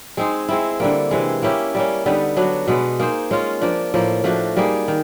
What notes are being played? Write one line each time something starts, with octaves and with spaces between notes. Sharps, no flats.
G#3 C4 D#4 G#4
G#3 C4 E4
D3 G3 A#3
C3 E3 G#3
A#3 C#4 E4 G4
G3 A#3 C#4
D3 G3 B3 D#4
F#3 B3 D4 F#4
B2 G#3 B3
A#3 D#4 G#4 C5
G#3 C#4 F4
F3 A#3 D4
A2 F3 A#3
F3 A3 D4 F#4
G3 A#3 D#4 G#4
D#3